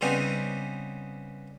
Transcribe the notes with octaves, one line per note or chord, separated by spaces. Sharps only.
C#3 G3 B3 C4 D#4 G#4